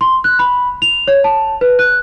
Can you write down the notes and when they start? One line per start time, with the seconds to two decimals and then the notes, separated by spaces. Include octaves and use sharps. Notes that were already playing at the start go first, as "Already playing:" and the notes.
0.01 C6
0.24 F#6
0.39 B5
0.82 F7
1.08 C#5
1.24 A5
1.61 B4
1.79 F#6